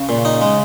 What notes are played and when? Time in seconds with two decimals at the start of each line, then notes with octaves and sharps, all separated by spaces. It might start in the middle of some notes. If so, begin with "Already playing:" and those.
Already playing: C#3
0.09 A#2
0.25 D#4
0.41 G#3